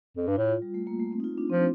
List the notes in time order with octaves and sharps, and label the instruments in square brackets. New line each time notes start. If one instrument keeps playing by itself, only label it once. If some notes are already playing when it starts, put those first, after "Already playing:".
[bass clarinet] F2
G2
[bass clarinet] A2 [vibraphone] F4
[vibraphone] F4
G3
A3
A#3
A3
C4
D#4
F4
D4
[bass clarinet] F3 [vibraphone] C4